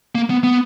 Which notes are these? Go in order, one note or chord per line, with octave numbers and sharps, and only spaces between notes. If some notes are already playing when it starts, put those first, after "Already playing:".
A#3
B3
B3